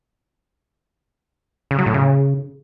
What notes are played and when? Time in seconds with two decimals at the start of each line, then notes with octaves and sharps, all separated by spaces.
1.71 C#3
1.79 F#3
1.86 A2
1.94 C#3